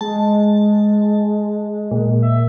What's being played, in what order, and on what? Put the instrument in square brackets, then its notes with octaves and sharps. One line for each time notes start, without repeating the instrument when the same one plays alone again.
[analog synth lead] G#3 [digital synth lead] A5
[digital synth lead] A#2
[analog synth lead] E5